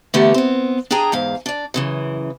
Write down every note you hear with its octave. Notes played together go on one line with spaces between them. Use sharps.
D3 E3 A3 B3 G4 A#4
B3 C4
D4 G#4 G5 G#5 A#5
E2 G#2 F5
D4 D5
F#2 C#3 E3